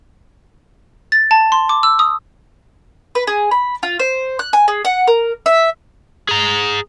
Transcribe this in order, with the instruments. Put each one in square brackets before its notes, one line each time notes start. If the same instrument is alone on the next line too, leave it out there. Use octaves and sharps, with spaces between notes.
[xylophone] A6
A5
C6
D6
E6
D#6
[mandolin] B4
G#4
B5
F4
C5
F#6
G#5
G#4
F#5
A#4
E5
[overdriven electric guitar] G#4 A#5